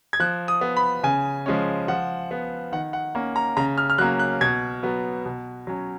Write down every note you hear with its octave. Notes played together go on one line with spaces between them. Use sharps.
G#6
F3 F#6
D#6
B3
B5
C#3 G#5
F3 G#3 C#4
F3 F#5
B3
D#3 F#5
F#5
A#3 C#4
A#5
C#3 A#5
F6
F6
F#3 A#3 C#4 F#6
F#6
B2 G#6
F#3 B3
B2
F#3 C#4